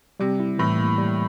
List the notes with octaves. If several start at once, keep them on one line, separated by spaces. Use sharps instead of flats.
C3 G3
E4
A2 E3
A#3
G3